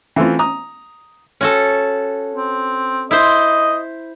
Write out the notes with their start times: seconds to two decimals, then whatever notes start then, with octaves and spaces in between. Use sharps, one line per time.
0.16 E3 A3 C4 F4
0.39 A#5 D#6
1.41 C#4 F#4 A4
2.34 C4
3.11 E4 C5 D#5